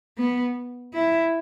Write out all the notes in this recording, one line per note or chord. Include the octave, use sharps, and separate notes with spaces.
B3
E4